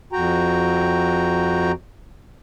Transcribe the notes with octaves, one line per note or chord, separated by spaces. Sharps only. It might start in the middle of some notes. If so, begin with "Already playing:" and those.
F2 F#4 G5 A#5